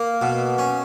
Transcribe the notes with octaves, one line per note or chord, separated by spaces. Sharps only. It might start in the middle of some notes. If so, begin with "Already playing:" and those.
Already playing: A#3
B2
C#4